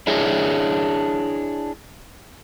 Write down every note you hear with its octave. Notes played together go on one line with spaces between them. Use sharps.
D4 E4 G#4 C#5 D#5 E5